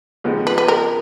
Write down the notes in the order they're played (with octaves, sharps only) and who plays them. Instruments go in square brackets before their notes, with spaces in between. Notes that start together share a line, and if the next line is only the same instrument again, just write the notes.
[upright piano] D#2 C#3 F3 B3 D#4
[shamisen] B4
B4
A#4